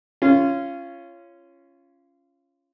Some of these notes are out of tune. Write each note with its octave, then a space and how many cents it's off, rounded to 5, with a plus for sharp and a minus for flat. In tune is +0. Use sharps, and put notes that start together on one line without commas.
C#4 +0 F4 -25